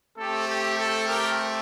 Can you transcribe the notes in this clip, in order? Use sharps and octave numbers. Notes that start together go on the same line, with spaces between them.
A3 C4 G4 A4
G4
A4
G4 A#4